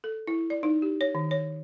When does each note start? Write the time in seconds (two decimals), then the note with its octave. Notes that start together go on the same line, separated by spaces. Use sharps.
0.04 A4
0.27 E4
0.50 D5
0.63 D#4
0.82 G4
1.01 C#5
1.15 D#3
1.31 C#5